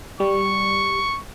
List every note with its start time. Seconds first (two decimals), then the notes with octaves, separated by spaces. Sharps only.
0.20 G3 C#6